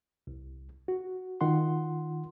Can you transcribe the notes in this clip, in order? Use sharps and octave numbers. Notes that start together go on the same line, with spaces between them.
C2
F#4
D#3 F4 F#5 C6